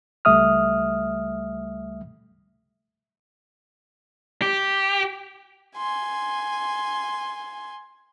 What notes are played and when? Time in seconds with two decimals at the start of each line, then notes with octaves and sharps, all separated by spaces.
0.25 C#2 G3 A3 E5 D#6 F6
4.42 G4
5.77 G#5 C6